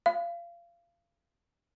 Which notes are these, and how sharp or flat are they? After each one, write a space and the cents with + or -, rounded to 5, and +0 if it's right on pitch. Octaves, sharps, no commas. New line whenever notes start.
F5 -25